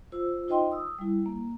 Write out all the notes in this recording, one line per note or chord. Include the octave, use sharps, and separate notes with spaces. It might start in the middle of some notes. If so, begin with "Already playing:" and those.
F4 C5 E6
D#4 F4 C5 D#5 G5 C6
D#6 E6
G3 E4
A#3